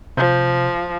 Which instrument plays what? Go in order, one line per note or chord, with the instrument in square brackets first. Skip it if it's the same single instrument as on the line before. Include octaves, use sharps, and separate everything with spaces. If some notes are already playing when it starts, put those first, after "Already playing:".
[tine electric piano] C3 C5 G6 [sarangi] F3